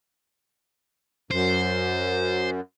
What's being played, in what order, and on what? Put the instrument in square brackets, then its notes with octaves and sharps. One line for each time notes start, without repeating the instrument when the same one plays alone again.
[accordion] F#2 [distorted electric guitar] C5